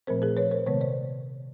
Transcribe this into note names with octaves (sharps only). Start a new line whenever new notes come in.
A#2 F3 A3 C4 A#4 C5
G#4 A#4
B4 C#5
A#4 C5
C3 D#3 G#3 B3 B4 C#5
C5 D5